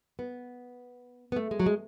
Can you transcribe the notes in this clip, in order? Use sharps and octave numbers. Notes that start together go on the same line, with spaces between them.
B3
B3
A3
G#3
F#3
G#3